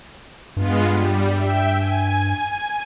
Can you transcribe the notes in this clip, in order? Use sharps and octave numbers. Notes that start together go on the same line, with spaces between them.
G2 G#3 B3 F4
G3
E5 G5
G#5